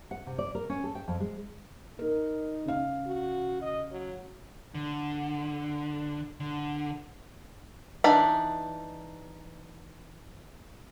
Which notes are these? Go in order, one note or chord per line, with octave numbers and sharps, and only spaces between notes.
F#5
C3
D5
A#4
C#4
A4
G5
F2
G#3
D#4 A#4
C#3 F5
F#4
D#5
F#3
D3
D3
E3 D4 D#4 D5 B5